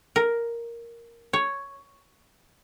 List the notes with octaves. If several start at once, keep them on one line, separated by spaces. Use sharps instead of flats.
A#4
C#5